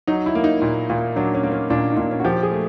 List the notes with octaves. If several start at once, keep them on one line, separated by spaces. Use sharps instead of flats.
F#3 D#4
E4
A#3
D#4
A#2
A#2
F#3 D4
C#4
A#3
C#4
A#2 D4
D#4
A#2 D4
C#4
F#4
F3 G4
G#4
A3